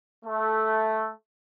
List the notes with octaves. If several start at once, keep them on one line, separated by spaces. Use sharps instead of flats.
A3